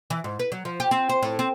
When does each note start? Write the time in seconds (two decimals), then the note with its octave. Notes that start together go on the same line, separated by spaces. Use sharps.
0.10 E3
0.24 G#2
0.39 B4
0.52 F#3
0.65 F3
0.80 G4
0.91 C4
1.09 C5
1.23 A2
1.39 C4